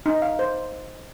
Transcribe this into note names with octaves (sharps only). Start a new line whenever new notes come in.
D#4
F5
C5